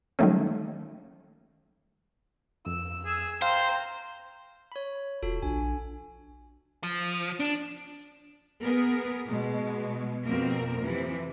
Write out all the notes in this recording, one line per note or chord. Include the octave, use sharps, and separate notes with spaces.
D#3 F#3 G3 A3 A#3 C#4
F2 E6
G#4
C5 F5 G5 A#5 C6
C#5 B5
E1 F4 F#4 A4
A#1 D4 G#5
F3
D4
B3 G#4 A#4
B2 G#3
F2 B2 A#3 C4 A#4
C3 E3 F3